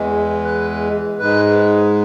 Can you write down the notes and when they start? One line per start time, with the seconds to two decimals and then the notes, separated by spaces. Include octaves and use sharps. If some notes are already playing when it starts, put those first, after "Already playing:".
Already playing: E2 E3 G#3
0.44 B4
1.19 G#2 G#3 B4